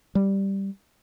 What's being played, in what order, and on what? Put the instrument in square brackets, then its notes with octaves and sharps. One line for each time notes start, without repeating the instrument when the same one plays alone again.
[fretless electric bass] G3